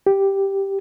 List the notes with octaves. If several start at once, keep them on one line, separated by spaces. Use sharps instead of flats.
G4